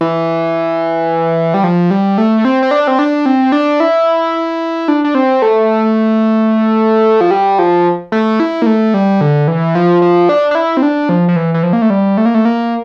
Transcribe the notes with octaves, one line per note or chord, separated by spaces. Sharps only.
E3
G3
F3
G3
A3
C4
C4
D4
C4
D4
C4
D4
E4
D4
D4
C4
A3
F3
G3
F3
A3
E4
A#3
A3
G3
D3
E3
F3
F3
D4
D4
E4
C4
D4
F3
F3
E3
E3
F3
A#3
A3
G3
A3
A#3
A3
A#3